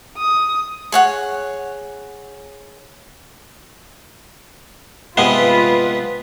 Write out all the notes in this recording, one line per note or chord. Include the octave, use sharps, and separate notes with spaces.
D#6
G#4 C#5 F#5
C3 G#3 B3 F4 B4